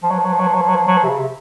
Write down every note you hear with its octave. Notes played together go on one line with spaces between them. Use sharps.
F3
F#3
F3
F#3
F3
F#3
F3
F#3
F3
F#3
F3
F#3
F3
C3
C#3
C3